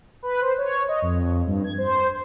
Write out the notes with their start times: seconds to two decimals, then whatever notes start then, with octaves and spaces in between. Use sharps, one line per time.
0.23 B4
0.41 C5
0.58 C#5
0.88 D#5
1.02 F2
1.47 G2
1.64 G#6
1.78 C5